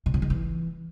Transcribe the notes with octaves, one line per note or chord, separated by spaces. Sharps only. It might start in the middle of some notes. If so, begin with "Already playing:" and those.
B2
C3
D#3
E3